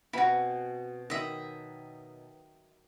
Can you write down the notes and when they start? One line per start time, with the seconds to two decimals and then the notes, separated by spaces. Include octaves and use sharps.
0.13 B2 C4 E4 F#4 G#5
1.10 D#3 F#3 D#5 E5 B5